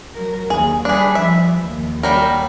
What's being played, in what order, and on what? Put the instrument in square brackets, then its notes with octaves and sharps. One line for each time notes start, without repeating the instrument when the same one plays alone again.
[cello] F#3 A#4
[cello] D#2 [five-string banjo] G#4
[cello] G3 B4 [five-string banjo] D4 G#4
[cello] F3 [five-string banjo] E5
[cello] D#2
[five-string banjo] F#3 G3 A#4